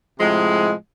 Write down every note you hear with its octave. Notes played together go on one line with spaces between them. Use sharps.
A2 C3 F3 G#3